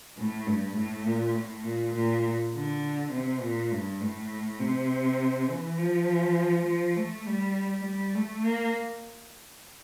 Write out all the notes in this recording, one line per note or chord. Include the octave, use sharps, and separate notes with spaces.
A2
G2
A2
A#2
A2
A#2
A#2
D3
C3
A#2
G2
A2
C3
E3
F3
F3
A3
G3
G3
A3
A#3